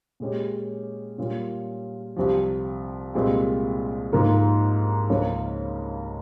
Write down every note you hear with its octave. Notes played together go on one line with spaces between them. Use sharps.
A#2 G#3 C#4 G4
A#2 G3 C#4 F4
C2 C3 F3
C2 A#2 G#3 C4 F4
G#2 F3 A#3 F4
C#2 C#3 F3 A#3 C#4